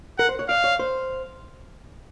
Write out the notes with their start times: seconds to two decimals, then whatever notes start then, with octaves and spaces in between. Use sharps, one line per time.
0.18 A#4 F#5
0.29 C5
0.39 C#5
0.48 D5 F5
0.64 C#5
0.79 C5